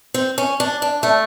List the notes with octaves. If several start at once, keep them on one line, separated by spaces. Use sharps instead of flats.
C4
C#4
D4
D4
A3